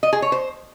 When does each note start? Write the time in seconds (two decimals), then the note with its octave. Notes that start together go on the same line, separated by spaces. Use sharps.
0.03 D#5
0.13 G#4
0.22 C#5
0.32 C5